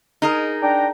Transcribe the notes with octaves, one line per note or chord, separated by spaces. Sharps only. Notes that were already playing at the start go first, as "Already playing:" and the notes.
D#4 G#4 A#4
D4 G5 A#5